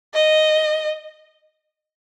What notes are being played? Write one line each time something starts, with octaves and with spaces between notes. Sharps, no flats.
D#5